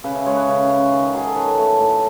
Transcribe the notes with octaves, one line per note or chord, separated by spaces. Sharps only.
C#3 B4
E5
G#3 C#5
B4
C#3
C#4
D#3
F#3 G#4
A4
D#3 B4
A3
A2